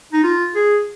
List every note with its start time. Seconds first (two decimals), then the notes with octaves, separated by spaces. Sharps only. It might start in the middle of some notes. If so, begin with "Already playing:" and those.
0.13 D#4
0.24 F4
0.55 G#4